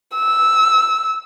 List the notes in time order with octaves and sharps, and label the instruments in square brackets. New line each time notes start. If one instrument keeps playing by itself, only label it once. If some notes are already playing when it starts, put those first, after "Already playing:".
[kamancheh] E6